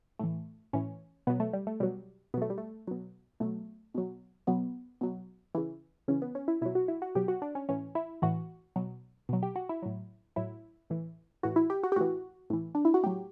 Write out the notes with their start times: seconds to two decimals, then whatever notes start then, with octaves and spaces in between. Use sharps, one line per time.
0.19 A2 E3 A3
0.73 A2 E3 C#4
1.27 B2 F#3 B3
1.40 A3
1.53 G3
1.67 A3
1.80 B2 F#3 G3
2.34 B2 B3
2.38 F#3 A3
2.50 G3
2.58 A3
2.88 B2 F#3
3.40 B2 F#3 A3
3.94 B2 F#3
4.47 B2 F#3 B3
5.01 B2 F#3
5.55 C#3 E3
6.08 C#3 E3 C#4
6.22 B3
6.35 C#4
6.48 E4
6.61 B2 F#3 E4
6.75 F#4
6.88 E4
7.02 F#4
7.15 B2 F#3 G4
7.28 F#4
7.42 D4
7.55 C#4
7.69 A2 E3 C#4
7.95 E4
8.22 A2 E3 F#4
8.76 B2 F#3
9.29 B2 F#3
9.43 G4
9.56 F#4
9.69 E4
9.82 A2 F#3
10.36 A2 F#3 E4
10.90 A2 E3
11.43 A2 E3 F#4
11.56 E4
11.70 G4
11.83 F#4
11.92 G4
11.96 A2 E3 F#4
12.50 A2 E3
12.75 D4
12.85 E4
12.94 F#4
13.03 A2 F#3 G4